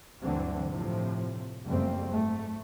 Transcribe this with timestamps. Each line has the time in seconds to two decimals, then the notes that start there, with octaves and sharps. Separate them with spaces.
0.20 D2 G2 D3 E3 F#3 C4
0.69 A2 C3 F3
1.66 F#1 F2 G3 A3 C4
2.11 G#2 A3